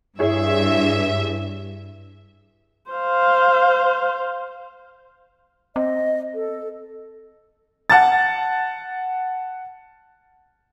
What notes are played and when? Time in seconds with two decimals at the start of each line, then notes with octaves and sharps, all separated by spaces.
0.19 G2 E4 G#4 C#5 E5
2.91 C5 F5
5.76 C4 D#5
6.35 A4
7.90 F#5 A5 A6